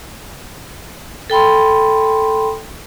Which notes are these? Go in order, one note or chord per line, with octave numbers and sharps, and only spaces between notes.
A4 G5 B5 C6